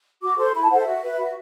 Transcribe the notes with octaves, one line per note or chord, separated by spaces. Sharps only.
F#4 D6
A4 C5 C6
E4 B5
A5
A4 C5 E5 F#5
F#4
B4
F#4